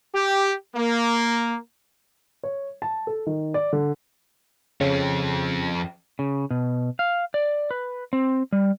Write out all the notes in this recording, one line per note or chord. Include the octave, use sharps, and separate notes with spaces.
G4
A#3
C#5
A5
A4
D#3
D5
D3
F2 C#3 C4
C#3
B2
F5
D5
B4
C4
G3